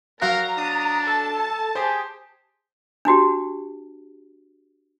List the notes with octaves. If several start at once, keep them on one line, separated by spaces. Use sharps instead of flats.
F#3 A#4 F5 A#5 F#6
D4 D#6
A4 A5
G4 G#4 C5
D4 E4 F#4 G4